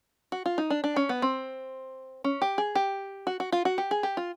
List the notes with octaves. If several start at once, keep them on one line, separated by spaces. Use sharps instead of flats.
F#4
F4
D#4
D4
D4
C#4
B3
C4
C#4
G4
G#4
G4
F#4
F#4
F4
F#4
G4
G#4
G4
F4